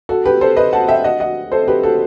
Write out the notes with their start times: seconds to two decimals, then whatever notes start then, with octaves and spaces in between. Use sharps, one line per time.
0.09 F#4 A4
0.25 G4 B4
0.41 A4 C5
0.57 B4 D#5
0.73 F#5 A5
0.88 E5 G5
1.04 D#5 F#5
1.20 D#5 F#5
1.52 A4 C5
1.68 G4 B4
1.83 F#4 A4